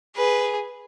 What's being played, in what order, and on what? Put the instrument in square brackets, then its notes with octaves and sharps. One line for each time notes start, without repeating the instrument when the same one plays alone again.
[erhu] G#4 [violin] B4